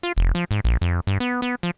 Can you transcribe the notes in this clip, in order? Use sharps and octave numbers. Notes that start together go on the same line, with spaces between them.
F4
F1
F3
G#2
A#1
F2
G2
B3
B3
F3